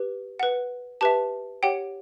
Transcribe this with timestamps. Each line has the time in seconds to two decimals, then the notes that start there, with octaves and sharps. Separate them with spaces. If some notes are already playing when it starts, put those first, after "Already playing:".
Already playing: G4 B4
0.39 B4 F#5
1.01 G4 B4 E5 A5
1.63 G4 C#5 F#5 G5